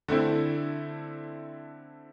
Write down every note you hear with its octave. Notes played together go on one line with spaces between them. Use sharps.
D3 A3 C4 E4